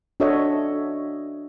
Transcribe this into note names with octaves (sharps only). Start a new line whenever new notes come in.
D4 F#4 A4 C#5 D#5 E5